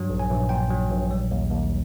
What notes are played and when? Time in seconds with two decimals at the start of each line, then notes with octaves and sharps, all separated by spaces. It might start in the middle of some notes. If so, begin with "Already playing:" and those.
Already playing: G2 F#3
0.10 A#1
0.20 G#5
0.30 A#1
0.49 A#2 G5
0.70 F#3
0.90 A#1
1.11 G3
1.31 D#2
1.51 D#2